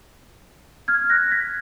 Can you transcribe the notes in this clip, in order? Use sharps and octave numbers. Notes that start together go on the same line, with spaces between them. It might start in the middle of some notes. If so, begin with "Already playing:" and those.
F6 G#6
F#6 A#6
G#6 B6